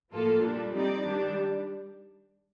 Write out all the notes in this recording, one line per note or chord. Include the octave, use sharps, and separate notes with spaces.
A2 F3 A#3 F4 A4
A#2 G3 D4
G3 C4 D#4 G4 D5
D#3 G3 D4 G4